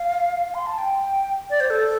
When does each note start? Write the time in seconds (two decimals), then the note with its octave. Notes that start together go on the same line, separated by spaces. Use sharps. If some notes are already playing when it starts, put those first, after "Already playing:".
Already playing: F5
0.54 C6
0.67 A5
0.78 G5
1.50 D5
1.60 C5
1.70 A4